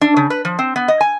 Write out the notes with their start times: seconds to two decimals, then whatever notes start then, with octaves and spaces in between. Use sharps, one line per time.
0.01 D4
0.17 C#3
0.30 B4
0.45 F3
0.59 C4
0.76 B3
0.88 D#5
1.01 G#5